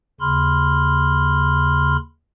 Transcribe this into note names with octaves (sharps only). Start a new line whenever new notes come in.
D#2 C#3 B5 C6 F6